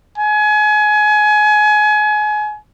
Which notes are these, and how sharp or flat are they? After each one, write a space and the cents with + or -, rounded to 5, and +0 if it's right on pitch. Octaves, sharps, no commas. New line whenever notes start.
G#5 +30